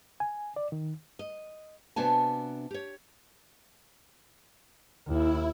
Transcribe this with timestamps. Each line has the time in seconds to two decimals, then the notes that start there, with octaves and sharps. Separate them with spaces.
0.20 G#5
0.56 D5
0.72 D#3
1.19 D#5
1.96 C3 B3 D4 F#4 G#5 A5
2.71 G4 C#5
5.07 D#2 E4